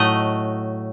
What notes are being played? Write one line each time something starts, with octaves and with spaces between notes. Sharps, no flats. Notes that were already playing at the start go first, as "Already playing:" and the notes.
Already playing: A2 F#3 A3 D#5